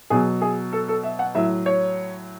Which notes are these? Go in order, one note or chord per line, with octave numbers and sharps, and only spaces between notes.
B2 F#3 G#4
G#4
A4
A4
E5
F#5
A2 F#3 E5
C#5